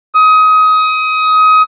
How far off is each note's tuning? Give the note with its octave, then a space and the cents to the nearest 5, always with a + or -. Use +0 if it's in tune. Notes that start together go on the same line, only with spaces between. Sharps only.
D#6 +25